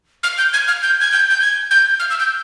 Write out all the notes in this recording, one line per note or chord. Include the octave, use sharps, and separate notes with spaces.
F6
G6
G#6
F6
G6
G#6
G6
G6
G#6
G6
F6
E6
G6